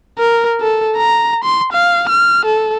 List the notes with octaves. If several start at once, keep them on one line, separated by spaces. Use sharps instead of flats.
A#4
A4
A#5
C6
F5
F6
A4